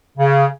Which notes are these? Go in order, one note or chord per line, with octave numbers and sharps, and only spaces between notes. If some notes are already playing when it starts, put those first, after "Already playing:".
C#3